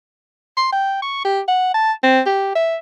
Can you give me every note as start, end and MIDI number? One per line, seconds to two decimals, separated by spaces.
0.57 0.71 84
0.72 1.01 79
1.02 1.20 85
1.25 1.41 67
1.48 1.69 78
1.74 1.92 81
2.03 2.20 60
2.26 2.54 67
2.55 2.76 76